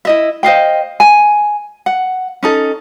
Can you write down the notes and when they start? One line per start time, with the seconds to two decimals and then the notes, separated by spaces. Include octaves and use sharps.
0.05 E4 D#5 E5
0.43 C5 D#5 F5 G5
1.00 G#5
1.86 F#5
2.43 C#4 D#4 A4